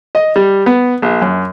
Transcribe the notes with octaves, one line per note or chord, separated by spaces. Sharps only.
D#5
G3
B3
A#1
F#2